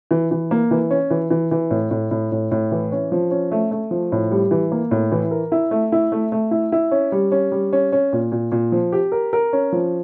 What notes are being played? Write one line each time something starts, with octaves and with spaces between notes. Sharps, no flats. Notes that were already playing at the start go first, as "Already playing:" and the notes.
E3
E3
A#3
E3
C#4
E3
E3
E3
A2
A2
A2
A2
A2
E3
C#4
F3
C#4
A3
A3
F3
A2
G3
E3
A#3
A2
E3
A#4
E4
A3
E4
A3
A3
E4
E4
C#4
G3
C#4
G3
C#4
C#4
A#2
A#2
A#2
F3
G4
A#4
A#4
C#4
F3